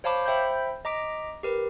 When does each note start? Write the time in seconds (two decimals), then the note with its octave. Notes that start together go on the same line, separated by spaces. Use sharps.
0.04 C5 C#5 F5 A5 B5 D6
0.26 C5 E5 G5 B5 G6
0.85 D#5 A#5 D6 B6 D7
1.43 G4 A#4 B4